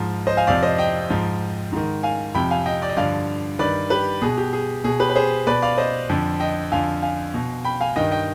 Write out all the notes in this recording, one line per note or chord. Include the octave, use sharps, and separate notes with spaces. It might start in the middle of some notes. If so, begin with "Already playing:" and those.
Already playing: G#2 F3
C5 D#5
F5 G#5
F2 C3 F3 D5 F5
C5 D#5
D#5 G5
G#2 F3
G#2 D#3
F5 G#5
F2 C3 F3 G5 B5
F5 G#5
D#5 G5
D5
D#5
G2 D3 F3 D5 F5
G2 D#3 B4 D5
G4 B4
B2 G#4
G4
G#4
B2 G#4
G4 B4
B4
G#4 C5
B2 B4 D5
D5 F5
C5 D#5
F2 D3 F3
D#5 G5
F2 D3 F3 F5 G#5
F5 G#5
B2
G5 B5
F5 G#5
G2 D#3 D#5 G5
D#5 G5